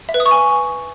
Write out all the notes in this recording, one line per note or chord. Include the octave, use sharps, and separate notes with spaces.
E5
B4
D#6
C#6
G#5